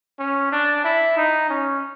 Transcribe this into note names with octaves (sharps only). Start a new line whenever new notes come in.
C#4
D4
E4
D#4
C#4